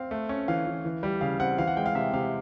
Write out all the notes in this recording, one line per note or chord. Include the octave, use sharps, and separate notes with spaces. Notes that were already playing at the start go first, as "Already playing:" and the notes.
Already playing: C4 F5
A3
C#4
E3 F5
E3
E3
G3
C#3 F5
C4 F#5
E3 F5
F#5
G#3 G5
F5
C3 E5
C3 F5